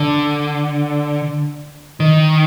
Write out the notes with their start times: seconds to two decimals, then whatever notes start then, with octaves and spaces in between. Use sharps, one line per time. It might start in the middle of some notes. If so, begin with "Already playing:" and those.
Already playing: D3
2.00 D#3